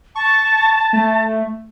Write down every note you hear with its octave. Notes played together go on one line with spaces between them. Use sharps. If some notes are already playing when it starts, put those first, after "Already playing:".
A5 C#6
A3